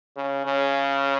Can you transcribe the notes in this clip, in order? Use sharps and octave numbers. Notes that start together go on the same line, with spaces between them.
C#3
C#3